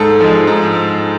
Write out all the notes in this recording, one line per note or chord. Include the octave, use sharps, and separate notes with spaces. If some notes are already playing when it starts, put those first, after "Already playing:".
Already playing: G#2 A4
F3 G#3
G#2